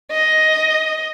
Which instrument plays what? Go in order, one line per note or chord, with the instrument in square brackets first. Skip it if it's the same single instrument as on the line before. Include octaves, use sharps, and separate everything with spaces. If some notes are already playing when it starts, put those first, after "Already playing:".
[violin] D#5